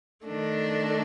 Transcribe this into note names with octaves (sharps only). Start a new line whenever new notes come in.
D#3 A3 D4